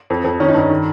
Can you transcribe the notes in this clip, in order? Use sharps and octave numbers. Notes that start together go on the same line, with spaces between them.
F2
F2
D#3 C#4
D#4
G2 C#4
D#3